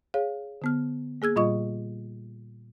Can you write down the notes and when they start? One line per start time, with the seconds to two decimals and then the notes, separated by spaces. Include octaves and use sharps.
0.14 G#4 C#5 F5
0.62 D3 B3 F6
1.22 A#3 G#4 E6 G#6
1.36 A#2 G3 F4 D#5 C#6